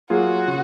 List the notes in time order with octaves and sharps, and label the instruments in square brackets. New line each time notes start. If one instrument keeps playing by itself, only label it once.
[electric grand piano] F#3 A#3 F4 G#4 [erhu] F#4
[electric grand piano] C#3